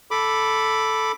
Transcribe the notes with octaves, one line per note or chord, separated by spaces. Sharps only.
A4 B5 D6